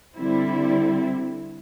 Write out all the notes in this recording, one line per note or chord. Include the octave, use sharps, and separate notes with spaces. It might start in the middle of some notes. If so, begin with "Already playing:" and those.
D3 G3 C4 E4